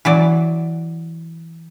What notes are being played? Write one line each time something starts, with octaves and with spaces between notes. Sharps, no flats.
E3 F#3 D5